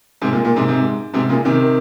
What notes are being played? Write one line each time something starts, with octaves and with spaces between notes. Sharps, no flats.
G#2 C3
A#2
A#2
G#2 C3
G#2 C3
G#2 C3
A#2 C#3
C3 D#3